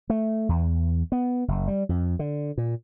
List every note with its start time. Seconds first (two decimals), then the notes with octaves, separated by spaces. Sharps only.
0.10 A3
0.49 E2
1.12 B3
1.48 F#1
1.68 G3
1.89 F2
2.19 D3
2.58 A#2